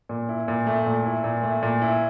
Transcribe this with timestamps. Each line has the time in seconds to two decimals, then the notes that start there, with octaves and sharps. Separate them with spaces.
0.09 A#2
0.29 E4
0.48 A#2
0.67 A3
0.86 A#2
1.06 E4
1.24 A#2
1.43 A3
1.63 A#2
1.82 E4